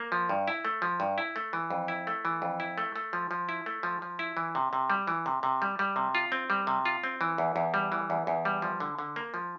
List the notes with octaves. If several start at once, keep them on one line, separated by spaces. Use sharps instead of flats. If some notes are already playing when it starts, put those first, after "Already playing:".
Already playing: A#3
F3
G2
E4
A3
F3
G2
E4
A3
E3
F2
E4
A3
E3
F2
E4
A3
A3
F3
F3
E4
A3
F3
F3
E4
E3
C3
C3
G3
E3
C3
C3
G3
G3
C3
F4
C4
G3
C3
F4
C4
E3
E2
E2
G3
E3
E2
E2
G3
F3
D3
D3
A#3
F3